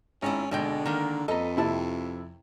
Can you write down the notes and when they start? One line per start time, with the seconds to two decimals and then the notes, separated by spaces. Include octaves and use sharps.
0.22 G#1 C#4 D#4 E4
0.51 G#1 B2 D3 G#3 G5
0.86 D#3 A#3 A#4
1.28 F2 A4 B4 D#5 A#5
1.57 C3 E4 A5